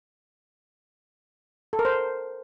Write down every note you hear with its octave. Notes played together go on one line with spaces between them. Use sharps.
A4
A#4
C5